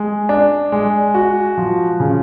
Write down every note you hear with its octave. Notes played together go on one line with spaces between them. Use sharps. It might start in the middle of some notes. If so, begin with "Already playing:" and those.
Already playing: G#3
D4
G#3
F#4
F3
C#3